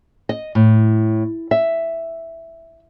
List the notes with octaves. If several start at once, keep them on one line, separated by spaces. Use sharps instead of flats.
D#5
A2
E5